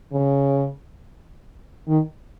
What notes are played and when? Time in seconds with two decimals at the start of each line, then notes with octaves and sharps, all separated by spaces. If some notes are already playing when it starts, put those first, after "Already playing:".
0.12 C#3
1.88 D#3